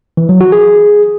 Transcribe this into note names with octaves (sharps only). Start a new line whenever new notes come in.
E3
F#3
F#4
G#4